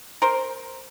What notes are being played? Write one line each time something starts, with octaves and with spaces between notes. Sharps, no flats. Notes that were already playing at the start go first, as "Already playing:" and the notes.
A#4 C5